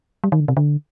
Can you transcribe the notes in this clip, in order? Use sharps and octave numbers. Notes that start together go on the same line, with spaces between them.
G3
D#3
D3
C3
D3